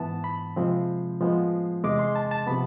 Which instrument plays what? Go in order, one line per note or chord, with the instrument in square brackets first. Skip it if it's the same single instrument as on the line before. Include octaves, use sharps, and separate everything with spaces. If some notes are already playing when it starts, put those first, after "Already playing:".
Already playing: [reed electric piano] G#2 E3 B3 A5
B5
C3 F3 G#3 C4
A2 F3 G#3 B3
E2 C3 G#3 D6
C6
A5
A5
C3 F3 B3 B5